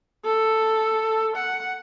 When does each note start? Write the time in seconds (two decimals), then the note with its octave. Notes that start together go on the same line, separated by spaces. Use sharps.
0.25 A4
1.37 F#5